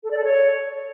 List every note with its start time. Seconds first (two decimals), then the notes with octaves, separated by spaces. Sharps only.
0.04 A4
0.10 D5
0.17 A4
0.23 C#5